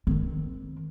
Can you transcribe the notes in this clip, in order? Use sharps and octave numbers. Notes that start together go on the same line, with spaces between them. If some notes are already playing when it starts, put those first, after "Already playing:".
D#3 C4